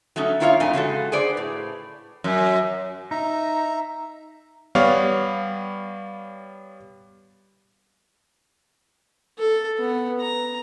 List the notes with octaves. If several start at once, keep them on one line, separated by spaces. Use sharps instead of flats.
F#3 A3 C#4 D#4
A#3 E4 F4 C#5 D#5 F5
F2 A2 F3 D#4 D#5 G#5
C#3 G#3 F#4 A4
G#4 B4 C5 D5
A2
F#2
D#4 E5 A#5
G3 B3 C#5 D5 F5
A4
B3
A#5